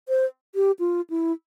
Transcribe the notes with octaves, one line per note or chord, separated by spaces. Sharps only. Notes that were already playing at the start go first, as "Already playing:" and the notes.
C5
G4
F4
E4